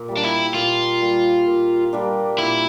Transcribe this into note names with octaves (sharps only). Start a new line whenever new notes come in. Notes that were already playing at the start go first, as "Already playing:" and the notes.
Already playing: A#2
G3 A#3
D4
E4
A#2 F4
G3 A#3
A#2
G3 A#3 D4
A#2 E4